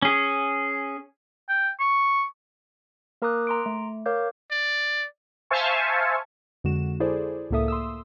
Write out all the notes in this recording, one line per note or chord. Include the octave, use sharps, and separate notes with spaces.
C#4 G#4
G5
C#6
A#3 A#4 A#5 D6 D#6 F#6
A#5 C6 D7
A3
A#4 C#5 F5 D6 G6
D5
C5 E5 F5 G#5 A5 C#6
F2 D3 G#3 F#4 E7
E4 G#4 A4 C5 D5
C#2 A2 A#3 A4 E5 D#6
C6 D#6 E6